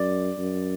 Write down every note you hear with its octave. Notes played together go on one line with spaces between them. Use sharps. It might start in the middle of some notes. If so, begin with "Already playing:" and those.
Already playing: F#2 D5
F#2